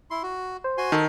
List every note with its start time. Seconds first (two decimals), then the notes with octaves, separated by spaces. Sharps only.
0.11 E4 C6
0.23 F#4
0.64 C5
0.78 F#4 G#5 C6
0.92 D#3 A4